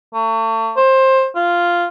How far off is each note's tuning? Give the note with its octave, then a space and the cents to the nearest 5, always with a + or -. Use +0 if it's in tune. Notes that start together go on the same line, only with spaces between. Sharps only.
A3 +40
C5 +20
F4 -5